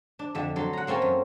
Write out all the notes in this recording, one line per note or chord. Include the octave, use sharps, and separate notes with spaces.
D4
F2 D3 E5
D3 F#3 A4 C6
F#5 A#5
A#3 C4 C#4 A4 A#4
F#2